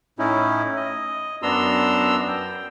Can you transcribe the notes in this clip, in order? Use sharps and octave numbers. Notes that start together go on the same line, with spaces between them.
A2 C#4 D#4 E4
D#5
F#2 B3 D4 A#5 C6 E6
G5